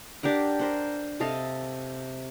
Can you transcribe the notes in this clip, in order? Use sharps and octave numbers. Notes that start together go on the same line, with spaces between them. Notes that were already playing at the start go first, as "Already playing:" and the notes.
D4 G4 A#4 F#5
A#4 C5 F#5
C3 A4 D#5 F5